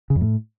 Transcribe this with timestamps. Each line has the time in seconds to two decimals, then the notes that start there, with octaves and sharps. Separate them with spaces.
0.10 C#3
0.16 F2
0.21 A2